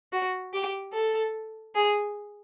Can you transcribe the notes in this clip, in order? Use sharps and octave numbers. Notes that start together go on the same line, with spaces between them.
F#4
G4
A4
G#4